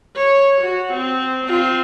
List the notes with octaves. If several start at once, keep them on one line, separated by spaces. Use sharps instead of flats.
C#5
F#4
C4
C4 F4